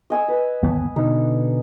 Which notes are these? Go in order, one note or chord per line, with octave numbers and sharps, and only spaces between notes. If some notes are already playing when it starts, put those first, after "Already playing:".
D#5 G#5 E6
B4
G1 D#2 B3
B2 D3 D#4